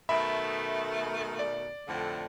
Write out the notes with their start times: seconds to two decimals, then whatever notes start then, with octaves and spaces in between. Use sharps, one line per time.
0.09 B2 D#3 A3 E5 B5
1.39 D5
1.88 F2 A2 D3